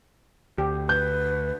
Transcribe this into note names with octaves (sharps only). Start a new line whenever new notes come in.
D2 G4
B4 G6